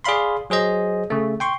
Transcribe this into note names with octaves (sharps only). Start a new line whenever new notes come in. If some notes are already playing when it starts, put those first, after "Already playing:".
G#4 D5 F5 B5 C6
F#3 G#4 C5 D#5
C#3 A3
G5 C6 C#6